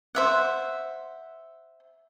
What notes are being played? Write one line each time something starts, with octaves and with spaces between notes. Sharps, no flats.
C5 E5 F#5